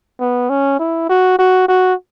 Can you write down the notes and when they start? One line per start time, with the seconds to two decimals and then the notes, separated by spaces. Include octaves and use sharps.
0.20 B3
0.49 C#4
0.79 E4
1.09 F#4
1.39 F#4
1.68 F#4